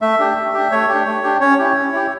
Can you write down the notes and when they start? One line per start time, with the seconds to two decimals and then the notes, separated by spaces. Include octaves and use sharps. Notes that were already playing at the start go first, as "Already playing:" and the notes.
0.02 A3 E5
0.19 D4 G4
0.37 A3
0.54 D4 G4
0.72 A3 C#5
0.89 D4 G4
1.06 A3
1.24 D4 G4
1.41 C#4 C#5
1.59 E4 G4
1.76 C#4
1.93 E4 G4